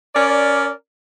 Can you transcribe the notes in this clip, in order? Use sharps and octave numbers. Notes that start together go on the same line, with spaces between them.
C#4 A#4 D5